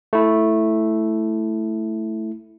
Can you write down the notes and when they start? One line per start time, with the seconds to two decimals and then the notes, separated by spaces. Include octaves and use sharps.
0.13 A3 E4